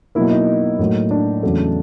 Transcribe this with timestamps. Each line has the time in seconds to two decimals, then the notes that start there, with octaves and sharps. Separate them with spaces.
0.15 B2 F#3 A#3 E4
0.31 D#4
0.79 A2 F#3 A#3
1.11 D4
1.43 E2 C#3 F#3 A3